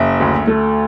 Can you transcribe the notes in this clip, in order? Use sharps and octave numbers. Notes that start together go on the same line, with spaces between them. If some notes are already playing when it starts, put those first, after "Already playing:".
Already playing: F#1 E5
D2
A3